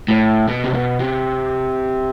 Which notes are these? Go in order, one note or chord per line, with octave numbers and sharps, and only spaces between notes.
A2
B2
C3
B2
C3